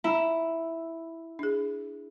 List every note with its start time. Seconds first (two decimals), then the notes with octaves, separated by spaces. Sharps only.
0.04 E4 A#5
1.39 D4 G#4